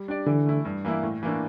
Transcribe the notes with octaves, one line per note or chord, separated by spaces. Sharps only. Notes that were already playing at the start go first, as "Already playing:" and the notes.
Already playing: G3
D4 G4 D5
D3 E3
A3 E4
G2
E3 A#3 E4
A2
E3 A#3 D4